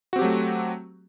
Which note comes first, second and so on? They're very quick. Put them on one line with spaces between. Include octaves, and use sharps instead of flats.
F#4 C4 G4 F#3 A3